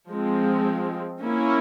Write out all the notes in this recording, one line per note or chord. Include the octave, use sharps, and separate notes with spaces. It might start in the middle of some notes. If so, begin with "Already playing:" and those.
F3 G#3 C4
A#3 C#4 E4